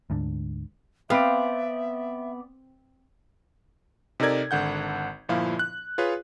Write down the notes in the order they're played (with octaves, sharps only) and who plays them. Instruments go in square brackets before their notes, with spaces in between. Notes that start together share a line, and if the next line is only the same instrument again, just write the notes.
[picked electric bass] D2 G#2 D3
[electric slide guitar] B3 D5 [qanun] C4 [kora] B4 F5 [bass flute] E5
[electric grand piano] C3 D#4 A4 A#4 D5 G#6
G#1 D3 F#5 G6
G1 A#2 F3 E4 F5
F#6
F4 G#4 B4 C#5